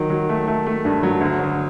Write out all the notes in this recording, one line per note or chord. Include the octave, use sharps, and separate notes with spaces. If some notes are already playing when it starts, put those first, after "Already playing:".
Already playing: D#3 F#3
F#3
A3
A3
A3
G2
F#3
D2
D2